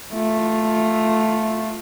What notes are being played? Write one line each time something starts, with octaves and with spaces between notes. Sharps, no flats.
A3 F4